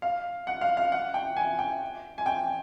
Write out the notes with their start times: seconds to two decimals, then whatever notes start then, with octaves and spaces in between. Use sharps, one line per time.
0.02 F5
0.47 F#5
0.61 F5
0.77 F5
0.92 F#5
1.14 G5
1.37 G#5
1.59 G5
2.18 G#5
2.26 G5